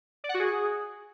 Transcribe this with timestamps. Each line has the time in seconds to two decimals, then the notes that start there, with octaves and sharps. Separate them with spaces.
0.24 D5
0.29 F#5
0.34 F#4
0.40 G#4